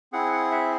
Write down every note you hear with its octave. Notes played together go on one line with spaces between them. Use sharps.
C4 E4 G#4 F#5
F#5
E5